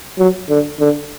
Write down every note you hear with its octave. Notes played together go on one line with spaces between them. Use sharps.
F#3
D3
D3